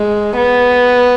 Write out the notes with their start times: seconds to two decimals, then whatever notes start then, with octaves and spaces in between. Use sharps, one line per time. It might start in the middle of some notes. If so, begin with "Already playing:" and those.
Already playing: G#3
0.36 B3